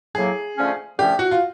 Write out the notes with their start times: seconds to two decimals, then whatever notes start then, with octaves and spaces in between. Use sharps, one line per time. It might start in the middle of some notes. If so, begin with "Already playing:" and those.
0.15 A2 F#3 A#3 G#4
0.57 D3 F3 A3 C#4
0.98 D3 F3 A3 C#4 G4
1.19 F#4
1.31 F4